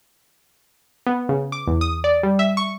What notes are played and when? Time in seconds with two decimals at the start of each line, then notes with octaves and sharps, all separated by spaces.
1.07 B3
1.29 C#3
1.52 D6
1.67 E2
1.81 D#6
2.04 D5
2.23 G3
2.39 E5
2.57 C#6